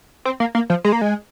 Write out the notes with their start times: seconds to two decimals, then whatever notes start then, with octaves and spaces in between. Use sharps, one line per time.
0.25 C4
0.40 A#3
0.55 A#3
0.70 F3
0.84 G#3
0.92 A#3
1.01 G#3